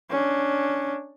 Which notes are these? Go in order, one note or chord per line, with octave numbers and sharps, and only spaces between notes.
C#4 D4